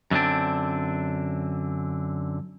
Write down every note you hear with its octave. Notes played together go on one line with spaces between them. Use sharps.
F#2 D3 C4 D4